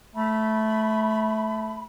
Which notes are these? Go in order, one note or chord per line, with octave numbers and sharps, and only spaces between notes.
A3 B5